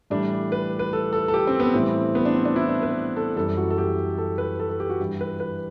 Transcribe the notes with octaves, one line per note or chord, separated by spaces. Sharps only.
A2 E3 G3 D4
B4
B4
A4
A4
A4
G4
C4
B3
A2 E3 G3 C4
B3
D4
C4
D4
E4
D4
B4
A4
F#2 E3 G3 A4
F#4
A4
G4
A4
B4
A4
A4
G4
F#4
G2 E3 G3
B4
B4